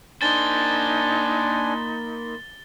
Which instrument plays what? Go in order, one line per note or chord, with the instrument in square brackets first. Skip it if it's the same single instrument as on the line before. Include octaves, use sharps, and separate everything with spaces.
[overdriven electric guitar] A#3 C5 [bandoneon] D4 G#5 [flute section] D#4 B5 [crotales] A6 G7